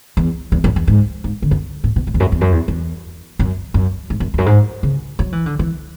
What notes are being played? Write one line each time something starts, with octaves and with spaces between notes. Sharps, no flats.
E2
E2
F#2
E2
G#2
G#2
D3
F#2
A2
B2
A2
E2
F#2
E2
F#2
E2
E2
F#2
F#2
G#2
F#2
E2
F#2
G#2
C#3
F#3
E3
D3
E3